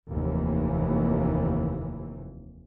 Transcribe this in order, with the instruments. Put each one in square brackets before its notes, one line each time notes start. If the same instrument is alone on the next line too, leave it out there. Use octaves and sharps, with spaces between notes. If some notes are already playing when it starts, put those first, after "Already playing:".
[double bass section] F1 D#2 E3